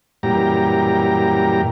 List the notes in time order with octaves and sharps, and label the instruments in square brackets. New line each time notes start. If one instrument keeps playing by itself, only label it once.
[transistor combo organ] F#2 A#2 E3 G3 G4 A#5